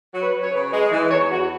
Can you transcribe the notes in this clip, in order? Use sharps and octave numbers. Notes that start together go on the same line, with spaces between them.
F#3
B4
F#3
C#5
C#3 B4
G#3
E3
E2 C#5
E2 F#4